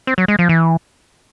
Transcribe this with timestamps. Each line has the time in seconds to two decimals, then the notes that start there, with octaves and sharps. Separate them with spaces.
0.07 C4
0.18 F#3
0.28 G#3
0.39 F3
0.49 E3